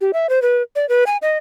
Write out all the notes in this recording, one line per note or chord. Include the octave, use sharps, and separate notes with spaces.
G4
E5
C5
B4
D5
B4
G#5
D#5